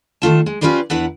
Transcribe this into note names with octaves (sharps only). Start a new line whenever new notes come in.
D#3 A3 F4 A5
G#3
C#4 F4 G4 B4 C5 D5
E2 D4 E4 B4 F#5 A#5